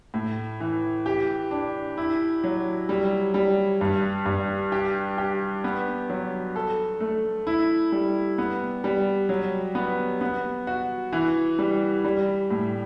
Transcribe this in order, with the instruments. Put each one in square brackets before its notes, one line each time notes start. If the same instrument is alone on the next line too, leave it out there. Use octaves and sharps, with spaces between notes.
[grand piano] A2
E3
G4
D4
E4
F#3
G3
G3
G2
G2
G4
G4
B3
F#3
A4
A3
E4
G3
B3
G3
F#3
B3
B3
F#4
E3
G3
G3
A2